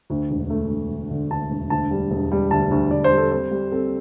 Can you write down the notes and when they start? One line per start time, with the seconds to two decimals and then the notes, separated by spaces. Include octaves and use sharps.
0.10 D2
0.30 E1
0.50 A3
0.71 E1
0.91 D3
1.11 D3
1.31 D2 A5
1.51 E1
1.70 D2 A5
1.91 G3
2.11 E1
2.31 G3
2.51 D2 A5
2.71 D2
2.91 D2 D5
3.04 C5
3.11 G3
3.18 A4
3.31 C4 C5
3.51 G3
3.72 C4 A4